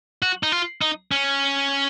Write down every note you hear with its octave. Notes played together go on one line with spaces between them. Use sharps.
F#4
D#4
F4
D#4
C#4